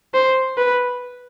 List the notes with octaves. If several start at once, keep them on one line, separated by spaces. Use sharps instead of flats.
C5
B4